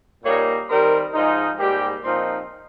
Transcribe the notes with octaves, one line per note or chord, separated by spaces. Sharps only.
A#2 G3 A#3 D#4 C#5
D#3 G3 C4 D#4 A#4
G#2 F3 G#3 D#4
G#2 G3 A#3 G4
A#2 F3 C4 D#4